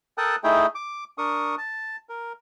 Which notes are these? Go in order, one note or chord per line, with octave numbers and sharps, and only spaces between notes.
A4 A#4 G5 A5 D#6 F#6
A3 D#4 E4 G#4 G5
D6
D4 A#4 C#6 D#6
A5
A#4